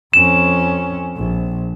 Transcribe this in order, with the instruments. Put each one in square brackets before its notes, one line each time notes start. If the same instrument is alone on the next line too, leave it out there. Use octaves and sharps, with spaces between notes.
[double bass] F2 C#4 [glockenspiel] E7
[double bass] A#1